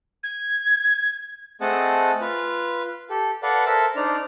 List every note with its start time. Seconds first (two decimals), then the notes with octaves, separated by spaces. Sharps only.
0.23 G#6
1.61 A3 C4 G#4 D#5 F#5 A5
2.21 F4 B4
3.10 G4 A4
3.43 A4 B4 D5 F5 F#5
3.66 A4 A#4 C5 E5 A5
3.96 D4 D#4 C5 D5 F6